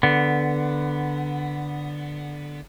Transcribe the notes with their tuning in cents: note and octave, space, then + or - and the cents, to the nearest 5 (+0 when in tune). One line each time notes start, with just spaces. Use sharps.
D3 +0 B3 +0